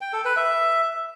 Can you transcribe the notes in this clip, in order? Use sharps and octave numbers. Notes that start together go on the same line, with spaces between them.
G5
A4
B4
E5